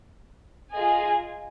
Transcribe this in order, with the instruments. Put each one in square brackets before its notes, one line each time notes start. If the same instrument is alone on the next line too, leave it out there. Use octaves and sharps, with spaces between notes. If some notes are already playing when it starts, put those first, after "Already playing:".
[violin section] F4 G#4 D#5 G#5